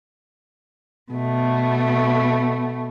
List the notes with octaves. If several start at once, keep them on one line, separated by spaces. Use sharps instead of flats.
B2 A3